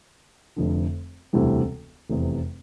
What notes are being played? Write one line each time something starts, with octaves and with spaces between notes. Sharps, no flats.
F1 F2 D3
E1 D2 C3 E3 G3
F1 E2 C3